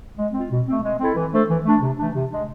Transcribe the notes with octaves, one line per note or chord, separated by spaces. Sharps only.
G#3
C4 F4
B2
A3 C4
G#3
C4 E4 A4
E3
A3 D4 A4 C5
E3
A3 D4
C3
E3 A3 D4
C3
G#3 D4